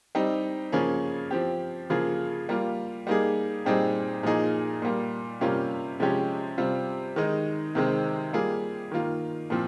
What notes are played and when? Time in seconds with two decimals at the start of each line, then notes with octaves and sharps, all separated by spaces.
0.15 G3 C4 D#4
0.72 C#3 F3 A#3 C#4 G#4
1.31 F3 C4 G4
1.90 C#3 F3 A#3 F4 G#4
2.49 G3 A#3 F4
3.07 G3 A#3 D#4 G#4
3.65 A#2 G3 C4 D#4 G#4
4.23 A#2 F3 A#3 D#4 G#4
4.82 A#2 G3 A#3
5.41 C3 G3 A#3 C#4 F4
6.00 C3 F3 G#3 C#4 G4
6.58 C3 G3 C4 F4
7.16 D#3 G#3 D#4
7.75 C3 D#3 G#3 C4
8.33 G3 A#3 F4 G#4
8.91 D#3 A#3 F4
9.50 A#2 F3 C4